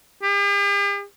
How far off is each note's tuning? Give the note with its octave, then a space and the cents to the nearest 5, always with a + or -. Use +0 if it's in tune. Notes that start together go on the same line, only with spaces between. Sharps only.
G4 +45